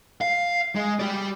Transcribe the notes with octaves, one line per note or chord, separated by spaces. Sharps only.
F5
G#3
G4 D5